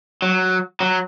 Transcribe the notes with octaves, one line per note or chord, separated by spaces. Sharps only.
F#3
F#3